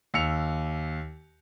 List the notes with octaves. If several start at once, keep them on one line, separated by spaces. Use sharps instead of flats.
D#2 E6 C#7 F7